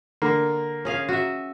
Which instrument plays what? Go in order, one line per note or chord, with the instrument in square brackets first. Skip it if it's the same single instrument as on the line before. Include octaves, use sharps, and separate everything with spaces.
[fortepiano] D3 A#3
[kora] C#4 G#4 F5
F#4 E5